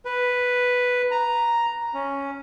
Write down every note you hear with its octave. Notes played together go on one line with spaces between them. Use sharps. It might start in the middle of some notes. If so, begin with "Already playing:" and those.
B4
A#5
C#4